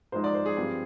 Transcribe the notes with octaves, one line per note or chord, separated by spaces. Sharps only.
G#2 F3 G#3 D#4 C5
D5
C5
G#4
G2 F3 C4